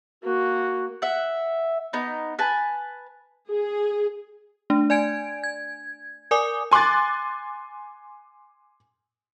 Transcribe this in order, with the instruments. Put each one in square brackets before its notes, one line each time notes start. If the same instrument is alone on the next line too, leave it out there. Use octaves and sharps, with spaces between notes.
[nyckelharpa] A#3 [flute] F#4
[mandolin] E5 F#5
B3 D#4
B4 G#5 A5
[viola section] G#4
[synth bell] A3 D4
D5 G#5 G#6 D7
G#6
A#4 D5 G#5 D6 D#6
[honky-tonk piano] G#5 C6 D6 F#6 A6